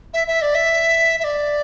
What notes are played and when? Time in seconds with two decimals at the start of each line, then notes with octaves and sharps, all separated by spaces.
0.13 E5
0.27 E5
0.41 D5
0.54 E5
1.19 E5
1.24 D5